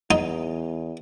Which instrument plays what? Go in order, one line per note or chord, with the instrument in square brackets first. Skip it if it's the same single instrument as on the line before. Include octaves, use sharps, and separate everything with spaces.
[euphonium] E2 [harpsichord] D#4